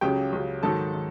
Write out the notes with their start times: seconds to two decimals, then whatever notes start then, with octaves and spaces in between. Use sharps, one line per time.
0.01 C#2 C#3 F#3 G4 G5
0.33 C#2 C#3 F#3
0.63 G#2 D#3 F#3 A4 A5
0.94 D#3